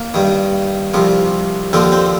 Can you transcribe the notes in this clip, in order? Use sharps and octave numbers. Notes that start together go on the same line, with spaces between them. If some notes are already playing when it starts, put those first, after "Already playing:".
Already playing: A#3
G2 D#3
C2 C3 F3
D#2 D3 F3 C4
C4